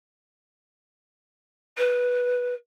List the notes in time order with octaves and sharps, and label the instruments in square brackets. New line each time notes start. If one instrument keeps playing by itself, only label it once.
[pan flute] B4